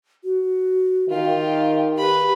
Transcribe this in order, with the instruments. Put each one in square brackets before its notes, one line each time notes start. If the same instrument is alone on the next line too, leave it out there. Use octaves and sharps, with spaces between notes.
[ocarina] F#4
[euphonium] D#3 [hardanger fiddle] F4 G4 [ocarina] F5
[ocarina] G4 [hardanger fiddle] B4 B5